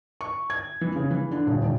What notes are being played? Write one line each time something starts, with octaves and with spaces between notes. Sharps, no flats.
C#6
G#6
E3
C#3
E3
D3
D#1
D#1